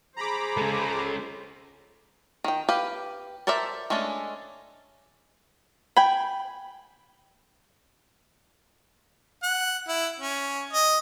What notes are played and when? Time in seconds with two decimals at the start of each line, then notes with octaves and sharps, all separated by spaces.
0.16 G#4 C5 A#5 B5 D6
0.57 G#3 C#4 A4
2.44 D#3 G5
2.69 G4 B4 F5
3.47 A4 A#4 C5 D5 E5
3.90 G#3 A3 C#4 D4 A4
5.97 G5 G#5 B5
9.43 F#5
9.88 E4
10.20 C#4
10.73 D#5